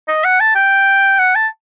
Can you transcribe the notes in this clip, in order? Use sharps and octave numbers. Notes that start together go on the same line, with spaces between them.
D#5
F#5
A5
G5
F#5
A5